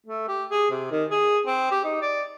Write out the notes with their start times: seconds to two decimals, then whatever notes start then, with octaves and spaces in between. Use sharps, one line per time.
0.07 A3
0.28 G4
0.51 G#4
0.71 C3
0.92 D#3
1.11 G#4
1.47 C4
1.71 G4
1.84 D#4
2.02 D5